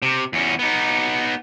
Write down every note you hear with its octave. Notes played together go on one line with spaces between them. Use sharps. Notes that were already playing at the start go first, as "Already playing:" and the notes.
C3
E2 C#4
B3 D#4